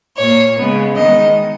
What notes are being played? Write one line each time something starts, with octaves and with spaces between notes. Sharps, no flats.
A#2 A#3 C#5
C#3 G#3 B3
D#3 G#3 B3 D#5